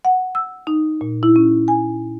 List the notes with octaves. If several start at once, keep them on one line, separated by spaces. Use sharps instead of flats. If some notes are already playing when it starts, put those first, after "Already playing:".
F#5
E6
D#4
A#2
E4
C#4
G#5